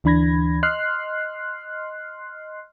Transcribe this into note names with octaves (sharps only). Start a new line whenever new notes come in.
D2 E3 D4 B5 G#6 A#6
D#5 C6 F6 F#6 C7